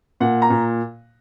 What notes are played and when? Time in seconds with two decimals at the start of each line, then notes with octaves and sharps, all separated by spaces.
0.20 A#2 F#5
0.42 A#5
0.50 A#2